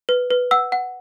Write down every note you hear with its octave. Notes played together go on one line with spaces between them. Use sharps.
B4
B4
F#5 E6
F#5